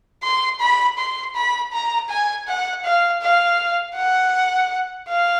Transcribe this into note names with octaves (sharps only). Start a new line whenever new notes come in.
C6
B5
C6
B5
A#5
G#5
F#5
F5
F5
F#5
F5